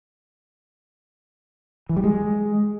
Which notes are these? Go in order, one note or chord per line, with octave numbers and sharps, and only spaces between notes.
E3
G3
G#3